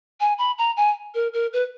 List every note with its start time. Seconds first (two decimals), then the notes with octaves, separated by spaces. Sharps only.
0.20 G#5
0.38 B5
0.58 A#5
0.77 G#5
1.14 A#4
1.34 A#4
1.53 B4